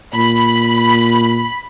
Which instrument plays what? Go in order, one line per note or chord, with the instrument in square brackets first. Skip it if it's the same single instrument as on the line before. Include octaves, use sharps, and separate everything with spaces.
[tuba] A#2 [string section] B5